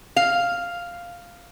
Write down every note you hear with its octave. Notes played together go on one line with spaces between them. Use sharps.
F5